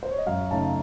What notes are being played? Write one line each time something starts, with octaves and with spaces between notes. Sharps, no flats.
C5
C#5
D#5
F#2 F5
C#3 A3 D#4 A5